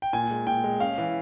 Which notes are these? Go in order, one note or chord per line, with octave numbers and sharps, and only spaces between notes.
G5
A#2 G#5
G#3
A#2 G5
G#3
C#4 F5
E3